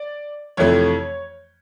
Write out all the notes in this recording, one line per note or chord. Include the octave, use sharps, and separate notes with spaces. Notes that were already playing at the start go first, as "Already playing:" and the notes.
Already playing: D5
F2 C3 E3 A3 C#5